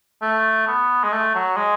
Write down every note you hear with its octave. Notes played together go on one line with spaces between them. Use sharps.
A3
B3
G#3
A3
F#3
G#3